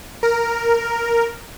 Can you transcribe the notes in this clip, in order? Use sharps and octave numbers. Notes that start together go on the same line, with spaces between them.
A#4